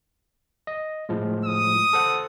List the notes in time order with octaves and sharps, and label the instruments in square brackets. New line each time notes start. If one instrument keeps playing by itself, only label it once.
[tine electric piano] D#5
A2 F3 G#3
[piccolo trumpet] D#6
[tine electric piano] A4 C5 F#5